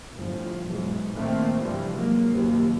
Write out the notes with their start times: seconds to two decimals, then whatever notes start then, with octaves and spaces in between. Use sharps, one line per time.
0.14 G1 A2 F3
0.68 B1 E2 G#2
1.14 A#1 A#2 D#3 A3 A#3 C4
1.60 G2 C3 E3 F3 G3
1.94 F#3 G#3 A#3
2.30 F#1 D#2 F3